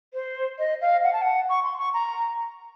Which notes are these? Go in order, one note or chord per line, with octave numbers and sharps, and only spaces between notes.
C5
D#5
F5
F#5
A5
F#5
C#6
C6
C#6
A#5